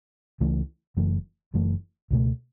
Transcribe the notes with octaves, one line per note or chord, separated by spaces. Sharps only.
C#2 C#3 E3 A3
F#1 F#2 E3 A3
F#1 F#2 E3 A3
C#2 B2 A3